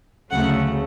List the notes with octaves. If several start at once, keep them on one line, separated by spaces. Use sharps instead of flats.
D2 C#3 F#3 A3 F#5